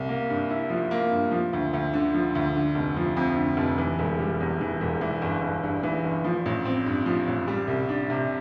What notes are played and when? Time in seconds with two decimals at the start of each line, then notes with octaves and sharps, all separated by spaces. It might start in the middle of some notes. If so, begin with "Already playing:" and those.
Already playing: C2
0.09 A#3
0.30 G2
0.50 E4
0.70 F3
0.91 A#3
1.12 G2
1.31 F3
1.53 D2
1.73 D2
1.93 D3
2.14 F3
2.35 D2
2.55 D3
2.75 F1
2.97 F3
3.16 F2
3.37 D3
3.57 F1
3.78 E3
3.99 E1
4.20 G3
4.40 E2
4.61 E3
4.81 E1
5.01 E3
5.22 G1
5.42 G1
5.63 G2
5.83 E3
6.04 G1
6.24 F3
6.46 A1
6.65 C4
6.86 G2
7.06 F3
7.27 A1
7.48 G3
7.67 C2
7.89 D4
8.10 C3